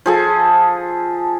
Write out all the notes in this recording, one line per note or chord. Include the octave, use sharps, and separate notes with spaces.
F3 G#4 A4